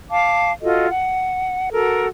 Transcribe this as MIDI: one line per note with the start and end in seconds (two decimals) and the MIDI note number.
0.10 0.52 77
0.10 0.52 81
0.10 0.52 86
0.62 0.87 65
0.62 0.87 66
0.62 0.87 69
0.62 0.87 75
0.89 1.70 78
1.71 2.08 66
1.71 2.08 69
1.71 2.08 70